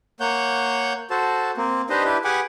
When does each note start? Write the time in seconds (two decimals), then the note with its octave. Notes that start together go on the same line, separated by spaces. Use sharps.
0.20 A#3 C#5 F#5 G6
1.10 F#4 A4 C5 A5
1.57 A#3 C4
1.90 D4 D#4 G4 B4 C5 D#5
2.05 D4 E4 G4 B4
2.24 G4 G#4 B4 F#5 G#5 D6